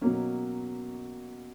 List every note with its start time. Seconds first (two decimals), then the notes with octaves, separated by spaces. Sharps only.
0.01 B2 F#3 A#3 C#4